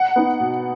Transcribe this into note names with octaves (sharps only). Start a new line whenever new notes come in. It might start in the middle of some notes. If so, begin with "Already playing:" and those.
Already playing: F#5
B3 D#4
B2